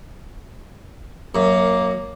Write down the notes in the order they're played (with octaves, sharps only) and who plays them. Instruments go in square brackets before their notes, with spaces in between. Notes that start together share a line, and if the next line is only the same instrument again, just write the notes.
[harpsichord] F#2 [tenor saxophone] A#3